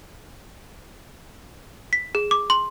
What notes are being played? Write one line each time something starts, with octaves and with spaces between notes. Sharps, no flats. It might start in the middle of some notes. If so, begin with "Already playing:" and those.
B6
G#4
D6
C6